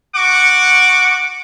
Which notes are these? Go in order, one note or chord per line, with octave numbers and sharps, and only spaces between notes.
F#4 F#5 C#6 D6